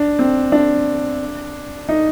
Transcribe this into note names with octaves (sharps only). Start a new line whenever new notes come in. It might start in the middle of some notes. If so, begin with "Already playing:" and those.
Already playing: D4
C4
D4
D#4